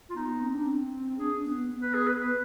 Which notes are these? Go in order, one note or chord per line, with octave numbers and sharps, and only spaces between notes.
F4
B3 D#4
C4
D4
C4
D4 G#4
B3
B3
B4
G#4
B4
B4